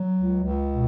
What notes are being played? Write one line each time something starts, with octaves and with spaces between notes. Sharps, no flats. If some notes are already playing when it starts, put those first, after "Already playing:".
Already playing: F#3
C#2
C#2
B2